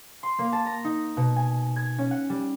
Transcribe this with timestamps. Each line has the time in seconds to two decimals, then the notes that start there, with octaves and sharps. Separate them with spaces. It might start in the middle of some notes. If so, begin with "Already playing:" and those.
0.23 C6
0.39 A#3
0.53 A5
0.65 A#5
0.84 D#4
1.17 B2
1.36 G#5
1.76 G#6
1.98 C#4
2.11 F#5
2.30 G3